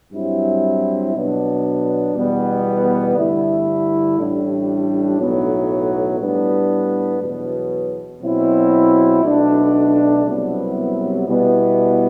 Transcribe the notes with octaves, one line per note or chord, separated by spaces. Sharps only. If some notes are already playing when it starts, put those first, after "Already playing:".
G2 F#3 C4 E4
B2 F#3 B3 D4
E2 B2 G3 B3
G2 D3 A3 E4
A1 A2 G3 D4
B1 A2 F#3 B3
A2 G3 B3 D4
E2 B2 F#3
B2 F#3 C4 E4
B1 B2 A3 D4
C2 C3 F#3 B3 E4
B2 G3 B3 E4